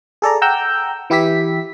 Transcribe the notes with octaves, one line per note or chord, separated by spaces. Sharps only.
G#4 A4 D5 A#5
F#5 G5 A#5 E6 G6
E3 E4 G4 E5 B6